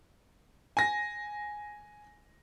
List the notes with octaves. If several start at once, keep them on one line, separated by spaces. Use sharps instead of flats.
G#5 A#6